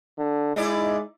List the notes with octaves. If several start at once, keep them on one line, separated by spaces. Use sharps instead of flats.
D3
G#3 D#4 E4 D5